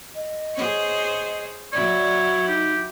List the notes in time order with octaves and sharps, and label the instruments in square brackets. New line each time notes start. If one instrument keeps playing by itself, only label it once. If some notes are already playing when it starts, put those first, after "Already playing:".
[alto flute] D#5
[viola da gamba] G#4 C5 C#5
[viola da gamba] F#3 E4 [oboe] C#5 [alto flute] D5
[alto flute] D#4 [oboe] G4